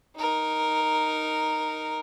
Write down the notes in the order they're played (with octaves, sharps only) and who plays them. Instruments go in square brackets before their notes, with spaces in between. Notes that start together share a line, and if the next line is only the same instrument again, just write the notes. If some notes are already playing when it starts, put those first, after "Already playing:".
[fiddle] D#4 A#4